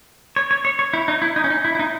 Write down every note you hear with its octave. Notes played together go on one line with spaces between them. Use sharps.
C#5
C#5
C#5
C#5
E4
D#4
E4
D#4
C#4
D#4
E4
E4
D#4